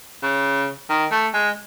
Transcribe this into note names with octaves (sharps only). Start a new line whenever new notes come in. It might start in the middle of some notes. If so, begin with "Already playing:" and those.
C#3
D#3
A3
G#3